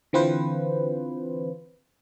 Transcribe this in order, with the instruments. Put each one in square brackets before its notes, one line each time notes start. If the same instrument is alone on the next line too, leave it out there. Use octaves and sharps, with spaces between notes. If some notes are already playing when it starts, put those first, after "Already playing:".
[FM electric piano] D3 E3 C4 F4 B4 C5